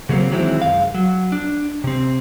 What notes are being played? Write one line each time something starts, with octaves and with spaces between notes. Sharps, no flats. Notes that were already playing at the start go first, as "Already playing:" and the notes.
C#3 F#3 G3 A#3 C4
D#3 E3 F#3 G#3 C4 E4
C2 F#2 G#3 F5
F#3
D4
C3 C4